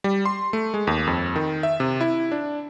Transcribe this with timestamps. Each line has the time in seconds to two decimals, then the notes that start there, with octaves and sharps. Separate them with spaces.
0.04 G3
0.25 C6
0.53 A3
0.74 G#3
0.87 D#2
1.07 F2
1.36 D#3
1.63 E5
1.80 C3
2.01 E4
2.32 D4